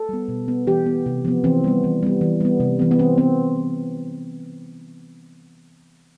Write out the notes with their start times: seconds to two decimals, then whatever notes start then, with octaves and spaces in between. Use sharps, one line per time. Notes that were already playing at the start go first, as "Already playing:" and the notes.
Already playing: A4
0.09 G3 B3
0.28 B2
0.48 B3
0.67 E3 G4
0.86 B3
1.06 C3
1.25 F3 B3
1.44 E3 C4
1.64 G3 B3
1.84 E3
2.03 G3 B3
2.21 E3
2.41 G3 B3
2.60 C3
2.79 E3 B3
2.91 B3
2.99 E3 C4
3.18 B3 C4